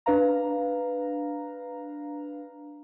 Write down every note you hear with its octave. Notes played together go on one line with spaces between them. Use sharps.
D4 B4 F5 A#5